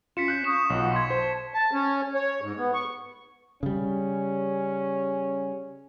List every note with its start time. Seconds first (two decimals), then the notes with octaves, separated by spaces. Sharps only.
0.17 C#4 F4 B6 C#7 E7
0.28 F#6 G6
0.44 F5 C#6 D#6 E7
0.70 B1 F4 F#5
0.92 C6 C#6 G#6
1.10 C5 A5
1.54 A5
1.73 C#4
2.14 C#5
2.42 G#2
2.58 B3
2.73 C#6
3.63 C#3 G3 C#4